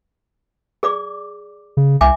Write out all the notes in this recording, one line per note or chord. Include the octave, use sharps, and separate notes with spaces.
G#4 D5 D6
C#3
C2 E5 G#5 D6